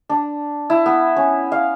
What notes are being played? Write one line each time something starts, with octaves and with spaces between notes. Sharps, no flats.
D4
E4
B3
C#4
F5